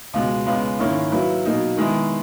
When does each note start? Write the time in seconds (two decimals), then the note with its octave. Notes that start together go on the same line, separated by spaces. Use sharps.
0.14 C#2 B2 G#3
0.47 C#2 C#3 G#3 B3
0.79 G#2 D#3 A#3 C#4 E4
1.12 F#3 A#3 E4 B4
1.45 B2 F#3 A#3 D#4
1.77 D#3 G#3 B3 E4 G#4